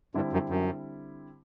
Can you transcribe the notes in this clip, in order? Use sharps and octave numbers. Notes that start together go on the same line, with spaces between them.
G2 D3 G3 C4 E4
F#2
F#2